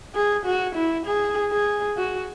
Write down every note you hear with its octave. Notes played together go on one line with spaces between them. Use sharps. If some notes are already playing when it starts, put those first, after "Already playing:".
G#4
F#4
E4
G#4
G#4
F#4